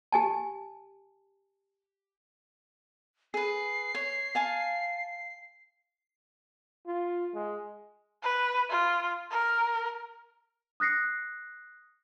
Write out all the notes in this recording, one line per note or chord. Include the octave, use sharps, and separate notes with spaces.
G4 G#5 A5
G#4 B4 C7
C#5
F5 G#5 A5
F4
G#3
B4
F4
A#4
D#6 F#6 A#6 C7 C#7